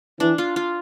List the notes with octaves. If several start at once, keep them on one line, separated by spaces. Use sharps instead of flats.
E3 D4
F4
F4